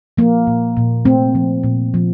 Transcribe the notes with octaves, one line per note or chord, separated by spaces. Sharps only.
F3 A#3
A#2
A#2
A3 C4
F3
A#2
F3